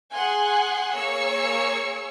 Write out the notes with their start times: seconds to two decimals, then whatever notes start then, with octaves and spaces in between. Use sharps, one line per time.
0.14 G#4 F#5 G#5 C6 F#6
0.95 A#3 G#4 C#5 C#6 E6 C#7